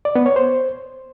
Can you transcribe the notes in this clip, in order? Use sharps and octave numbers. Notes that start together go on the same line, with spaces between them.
D5
B3
C#5
C5